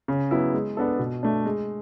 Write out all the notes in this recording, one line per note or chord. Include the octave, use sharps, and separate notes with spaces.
C#3
F#3 B3 E4
G#3
B3 D4 A4
B2
A3 D4
G#3